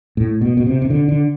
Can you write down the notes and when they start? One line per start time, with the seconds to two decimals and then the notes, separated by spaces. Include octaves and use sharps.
0.17 A2
0.41 B2
0.57 B2
0.67 C3
0.82 C3
0.90 D3
1.09 D3